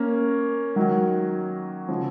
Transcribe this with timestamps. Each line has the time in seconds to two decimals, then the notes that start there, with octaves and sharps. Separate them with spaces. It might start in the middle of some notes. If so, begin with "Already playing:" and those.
Already playing: A#3 C#4
0.76 D#3 F#3
1.89 C#3 F3